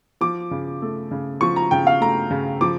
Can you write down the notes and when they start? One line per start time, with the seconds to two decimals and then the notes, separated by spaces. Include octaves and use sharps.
0.21 F3 D6
0.51 C#3
0.82 A3
1.11 C#3
1.41 F3 C#6
1.56 A#5
1.71 C#3 G5
1.87 F5
2.01 A3 A#5
2.31 C#3
2.61 F3 D6